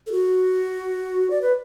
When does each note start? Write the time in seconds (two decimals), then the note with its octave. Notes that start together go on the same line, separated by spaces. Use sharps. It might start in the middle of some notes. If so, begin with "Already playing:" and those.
0.07 A4
0.12 F#4
1.30 D5
1.42 B4